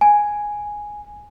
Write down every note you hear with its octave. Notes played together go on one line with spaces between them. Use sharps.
G#5